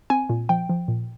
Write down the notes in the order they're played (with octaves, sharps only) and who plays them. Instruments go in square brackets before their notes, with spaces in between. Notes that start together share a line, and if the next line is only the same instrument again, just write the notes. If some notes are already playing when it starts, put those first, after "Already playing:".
[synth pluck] C4 G#5
A#2
F3 G5
F3
A#2